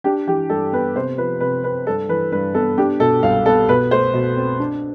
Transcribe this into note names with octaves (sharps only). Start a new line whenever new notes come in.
D4 G4
E3 G4
G2 A4
B3 B4
C3 C5
F3 B4
C3 B4
C4 B4
G2 A4
E3 B4
G2 B4
B3 A4
D4 G4
B2 A4
C2 F5
B3 A4
B2 B4
A3 C5
B2
C4
D4